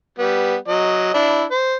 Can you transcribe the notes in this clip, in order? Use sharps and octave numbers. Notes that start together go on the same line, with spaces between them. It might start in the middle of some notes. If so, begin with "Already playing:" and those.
G3 B3
F#3 D#5
D4 E4
C5